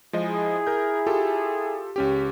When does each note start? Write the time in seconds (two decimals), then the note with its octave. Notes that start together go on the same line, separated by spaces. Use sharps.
0.13 F3 G#3 E4 G#4 D#5
0.67 A#4 G6
1.07 F4 G4 A4
1.96 C#2 C#4 G4